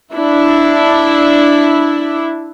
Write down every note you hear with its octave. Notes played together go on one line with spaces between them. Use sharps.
D4 E4